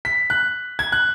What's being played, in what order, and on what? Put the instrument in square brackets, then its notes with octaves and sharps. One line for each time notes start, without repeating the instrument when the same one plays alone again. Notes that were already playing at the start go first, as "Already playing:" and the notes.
[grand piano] B6
F#6
G#6
F#6